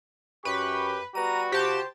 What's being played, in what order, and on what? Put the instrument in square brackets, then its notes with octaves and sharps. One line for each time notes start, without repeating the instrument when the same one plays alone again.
[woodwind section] F#2 [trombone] G4 [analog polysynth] B4 [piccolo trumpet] C#6
[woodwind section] G3 B3 B4 [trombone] F#4 [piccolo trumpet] A#5 [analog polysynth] D#7
[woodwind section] C3 F3 [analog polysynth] G4 A5 [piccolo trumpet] C5